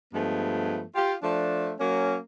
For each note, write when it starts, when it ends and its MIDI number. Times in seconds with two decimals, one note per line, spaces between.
0.13 0.84 43
0.13 0.84 53
0.13 0.84 56
0.13 0.84 57
0.13 0.84 59
0.95 1.13 65
0.95 1.13 67
1.22 1.73 53
1.22 1.73 57
1.22 1.73 62
1.79 2.16 54
1.79 2.16 58
1.79 2.16 61